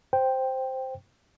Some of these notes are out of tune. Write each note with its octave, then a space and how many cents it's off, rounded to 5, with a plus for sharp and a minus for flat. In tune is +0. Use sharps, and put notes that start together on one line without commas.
C5 +0 G5 +0